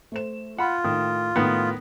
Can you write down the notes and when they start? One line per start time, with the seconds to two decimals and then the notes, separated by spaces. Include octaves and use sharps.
0.12 A3 C5 E7
0.58 F4 F#5 B5
0.84 A2 D#3
1.36 A2 D#3 B3 A#6 C#7